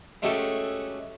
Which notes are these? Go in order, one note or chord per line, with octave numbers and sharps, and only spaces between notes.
G#3 A3 C#4 F#4 G4 A4